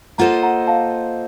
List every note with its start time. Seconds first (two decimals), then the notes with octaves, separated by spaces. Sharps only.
0.18 A#3 F4 A4 C5 D#5 F#5 A#5
0.43 F#5 A#5
0.67 F5 A5